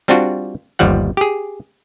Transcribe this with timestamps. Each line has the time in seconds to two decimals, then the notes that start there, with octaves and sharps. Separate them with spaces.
0.08 G3 C4 D4 F4 F#4
0.79 G1 D#2 F3 G3 F#5
1.17 G4 G#4